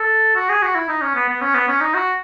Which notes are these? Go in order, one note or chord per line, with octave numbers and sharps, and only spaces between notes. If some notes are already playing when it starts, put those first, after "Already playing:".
Already playing: A4
F#4
G#4
F#4
E4
D#4
C#4
B3
B3
C#4
B3
C#4
D#4
F#4